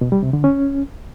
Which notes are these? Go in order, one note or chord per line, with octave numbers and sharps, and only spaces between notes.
B2
G3
C3
D3
C#4